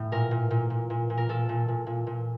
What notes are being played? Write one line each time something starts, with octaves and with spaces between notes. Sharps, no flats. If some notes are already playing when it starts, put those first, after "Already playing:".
Already playing: A2
A#2 A#4
A#2
A#2
A#2
A#2
A#2
A#4
A#2 A4
A#2
A#2
A#2
A#2